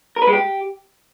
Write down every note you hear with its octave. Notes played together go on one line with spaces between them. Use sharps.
A#4
B4
G#3
G4